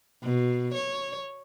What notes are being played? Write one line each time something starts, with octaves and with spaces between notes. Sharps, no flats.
B2
C#5